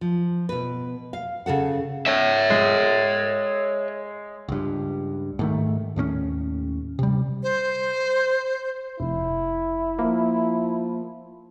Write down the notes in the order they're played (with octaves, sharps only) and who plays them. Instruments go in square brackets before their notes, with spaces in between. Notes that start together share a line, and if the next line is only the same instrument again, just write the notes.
[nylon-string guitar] F3
B2 B4
F5
C#3 G#4 A4 F#5
[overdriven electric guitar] C#5 E5
[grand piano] G#3
[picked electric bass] C#2 G2
G#2 D#3 A3
D#2 A2 B3 C#4
C3 G3
[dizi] C5
[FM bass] F1 [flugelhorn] E4
[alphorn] F3 [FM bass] A#3